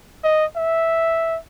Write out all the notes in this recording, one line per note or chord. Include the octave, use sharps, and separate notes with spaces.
D#5
E5